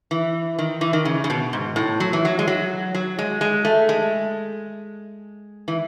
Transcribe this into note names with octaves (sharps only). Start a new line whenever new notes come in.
E3
D#3
E3
D#3
C#3
C#3
B2
G#2
A2
F#3
E3
F#3
G#3
F#3
F#3
G#3
G#3
A3
G#3
E3